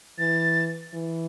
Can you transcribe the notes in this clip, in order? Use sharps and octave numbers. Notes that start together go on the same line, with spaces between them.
E3 A6
E3